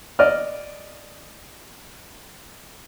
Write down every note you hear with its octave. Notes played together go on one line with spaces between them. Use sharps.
D5 D#5 F6